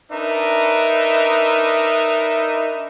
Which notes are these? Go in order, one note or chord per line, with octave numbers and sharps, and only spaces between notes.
D4 D#4 A#4 B4 D#5 E5